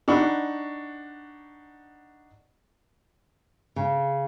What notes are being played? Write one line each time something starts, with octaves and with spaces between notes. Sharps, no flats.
D4 D#4 F#5 B5 C#6
C#3